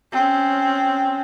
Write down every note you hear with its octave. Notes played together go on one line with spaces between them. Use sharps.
C4 C#4